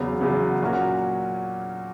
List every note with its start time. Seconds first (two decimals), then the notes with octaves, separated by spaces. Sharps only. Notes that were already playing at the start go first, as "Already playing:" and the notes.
Already playing: E2 C#3 F#3 B3
0.21 E2 C#3 F#3 B3
0.62 A#2 F#3 C#4 F#4 A#4